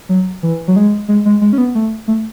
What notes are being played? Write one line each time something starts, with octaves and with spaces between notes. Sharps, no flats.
F#3
E3
F#3
G#3
G#3
G#3
G#3
C#4
B3
A3
A3